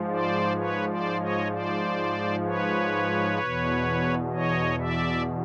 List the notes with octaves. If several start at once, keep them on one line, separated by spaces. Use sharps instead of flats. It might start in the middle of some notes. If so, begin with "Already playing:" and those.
Already playing: G#2 F3
C5 D5
B4 C#5
C5 D5
C#5 D#5
C5 D5
B4 C#5
E2 B2
C#5 D#5
D5 E5